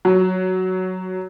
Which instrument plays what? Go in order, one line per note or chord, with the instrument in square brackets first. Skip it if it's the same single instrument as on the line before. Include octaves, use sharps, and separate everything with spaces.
[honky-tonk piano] F#3